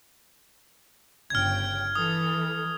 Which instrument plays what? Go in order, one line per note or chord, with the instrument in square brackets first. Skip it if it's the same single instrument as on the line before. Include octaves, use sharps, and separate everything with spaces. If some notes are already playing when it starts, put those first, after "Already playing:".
[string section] G1 C#3 G5 [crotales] F6 G#6
[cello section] E3 [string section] A4 [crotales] D#6